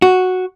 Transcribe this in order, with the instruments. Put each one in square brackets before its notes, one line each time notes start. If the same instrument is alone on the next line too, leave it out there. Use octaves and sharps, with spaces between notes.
[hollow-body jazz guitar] F#4